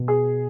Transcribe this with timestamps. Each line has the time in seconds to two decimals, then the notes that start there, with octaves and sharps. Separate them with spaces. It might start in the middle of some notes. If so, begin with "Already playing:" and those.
Already playing: B2
0.08 G#4